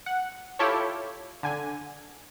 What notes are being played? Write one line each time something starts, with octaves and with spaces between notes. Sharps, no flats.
F#5
E4 F4 G4 A4 C#5
D3 G#5